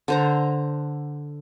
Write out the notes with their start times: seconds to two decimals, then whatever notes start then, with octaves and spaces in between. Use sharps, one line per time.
0.08 D3 C5 A#5